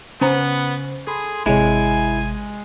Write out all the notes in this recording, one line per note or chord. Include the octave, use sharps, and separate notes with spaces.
C#3 B3 C#4 C5 G#5 A#5
G#4 A4 B5 C6
G#1 C3 G#3 E4 C#5 G#5